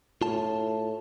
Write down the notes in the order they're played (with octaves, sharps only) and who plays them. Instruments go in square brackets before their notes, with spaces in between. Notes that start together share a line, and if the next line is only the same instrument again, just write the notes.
[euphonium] A2 [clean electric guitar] F4 A5